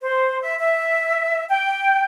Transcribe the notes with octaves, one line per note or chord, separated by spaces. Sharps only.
C5
E5
E5
G5